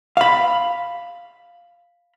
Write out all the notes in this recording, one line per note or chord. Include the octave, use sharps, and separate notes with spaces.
F5 B5